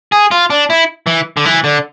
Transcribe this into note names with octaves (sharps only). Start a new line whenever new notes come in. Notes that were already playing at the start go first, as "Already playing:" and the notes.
G#4
F4
D4
E4
E3
D3
E3
D3